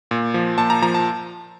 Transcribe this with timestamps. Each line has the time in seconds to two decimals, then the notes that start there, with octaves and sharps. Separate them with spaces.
0.11 A#2
0.34 F3
0.58 A#2 A5
0.70 A#5
0.82 F3 A#5
0.94 A5